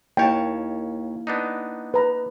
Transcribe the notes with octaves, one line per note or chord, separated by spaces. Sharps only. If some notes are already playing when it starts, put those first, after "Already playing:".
D#2 A#3 E4 C#5 F5 G5 A5
B3 D4 D#4
B4 A#5